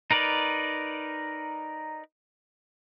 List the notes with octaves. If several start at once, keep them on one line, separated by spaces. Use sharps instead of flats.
D#4 A#4 B4 D5